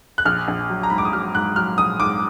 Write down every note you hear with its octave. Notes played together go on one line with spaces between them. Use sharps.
F#6
A#1 F6
A#1
F#3
A#5
G#2 B5
D6
D#6
F#3 F6
G#2 F#6
F#3 F6
A#1 D#6
G#2 D6